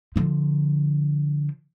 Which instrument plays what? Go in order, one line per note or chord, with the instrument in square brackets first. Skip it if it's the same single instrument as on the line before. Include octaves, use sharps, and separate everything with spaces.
[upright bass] D3 F3